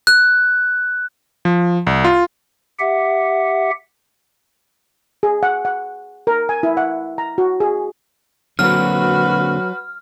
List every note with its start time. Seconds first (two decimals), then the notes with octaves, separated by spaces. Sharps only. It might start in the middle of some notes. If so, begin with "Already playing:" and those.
0.07 F#6
1.45 F3
1.87 C2
2.04 F4
2.79 G4 E5 F#5
5.23 G#4
5.43 F#5
5.65 F#5
6.27 A#4
6.49 G#5
6.63 E4
6.77 F#5
7.18 A#5
7.38 F#4
7.60 G#4
8.59 D3 F#3 A#3 C4 F#4 B4 F6